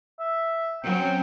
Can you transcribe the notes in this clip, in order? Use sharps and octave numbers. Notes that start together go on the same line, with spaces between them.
E5
F#3 C4 C#4 G5